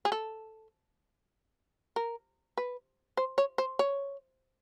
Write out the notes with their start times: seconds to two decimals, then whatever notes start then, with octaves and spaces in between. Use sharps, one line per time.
0.05 G#4
0.12 A4
1.96 A#4
2.57 B4
3.17 C5
3.38 C#5
3.58 C5
3.79 C#5